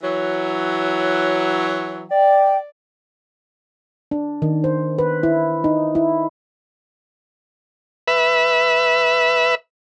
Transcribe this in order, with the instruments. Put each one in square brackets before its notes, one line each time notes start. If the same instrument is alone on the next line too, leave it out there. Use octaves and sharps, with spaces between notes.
[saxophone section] E3 F#3
[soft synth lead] D5 [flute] G5
[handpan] D4
D#3
C5
B4
E4
D#4
E4
[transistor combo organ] B4 E5